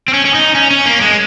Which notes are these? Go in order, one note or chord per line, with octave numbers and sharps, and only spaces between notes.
C4
C#4
C#4
D#4
C#4
C#4
A#3
G#3